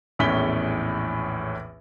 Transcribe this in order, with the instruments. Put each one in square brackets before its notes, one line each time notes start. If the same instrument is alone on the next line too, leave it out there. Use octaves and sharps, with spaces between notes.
[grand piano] A#1 E2 A2 C#4 B6 G7